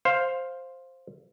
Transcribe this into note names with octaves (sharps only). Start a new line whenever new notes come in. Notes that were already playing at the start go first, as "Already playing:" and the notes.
C5 F5